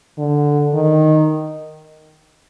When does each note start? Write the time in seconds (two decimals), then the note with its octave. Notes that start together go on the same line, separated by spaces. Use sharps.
0.18 D3
0.74 D#3